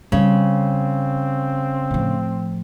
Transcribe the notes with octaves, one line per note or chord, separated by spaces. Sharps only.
C#3 G3 C4 C#4
A2 F3